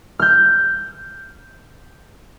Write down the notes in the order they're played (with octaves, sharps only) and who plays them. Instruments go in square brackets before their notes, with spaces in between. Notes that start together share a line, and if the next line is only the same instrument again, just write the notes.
[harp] F6 G6